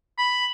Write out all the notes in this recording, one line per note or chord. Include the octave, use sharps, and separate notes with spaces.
B5